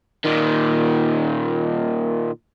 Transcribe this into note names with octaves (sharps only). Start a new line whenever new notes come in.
A#2 D#3